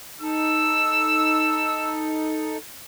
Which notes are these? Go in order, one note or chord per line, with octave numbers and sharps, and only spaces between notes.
D#4 A4 E6